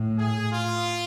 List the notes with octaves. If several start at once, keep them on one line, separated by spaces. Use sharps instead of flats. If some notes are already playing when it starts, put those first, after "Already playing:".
Already playing: A2
G#4
F4